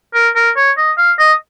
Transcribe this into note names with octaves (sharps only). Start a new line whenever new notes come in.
A#4
A#4
C#5
D#5
F5
D#5